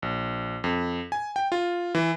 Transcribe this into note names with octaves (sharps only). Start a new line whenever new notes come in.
A#1
F2
G#5
G5
F4
E3